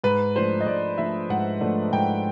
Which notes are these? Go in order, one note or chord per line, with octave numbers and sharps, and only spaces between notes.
G#2 B4
F3 A3 D4 C5
D#5
G#2 D5
F3 A3 D4 E5
G#2 F#5
F3 A3 D4
G#2 G5